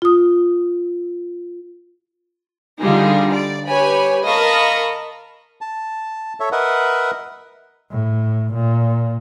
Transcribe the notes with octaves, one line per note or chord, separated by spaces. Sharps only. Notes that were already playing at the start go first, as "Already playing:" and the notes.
F4 D#6
D3 G3 D#4 F4 G#4
D5
G4 B4 C#5 G#5 B5
A#4 D#5 F5 A5 B5 C#6
A5
A4 C#5 E5
A#4 B4 D#5 E5 F#5
A2
A#2